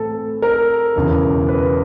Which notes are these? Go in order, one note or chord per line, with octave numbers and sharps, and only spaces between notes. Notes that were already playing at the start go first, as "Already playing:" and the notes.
Already playing: A2 E3 A3 C4 A4
A#4
E1 E2 C#3
B4